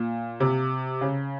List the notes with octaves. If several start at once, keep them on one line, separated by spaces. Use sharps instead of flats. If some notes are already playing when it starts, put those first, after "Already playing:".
Already playing: A#2
C3
C#3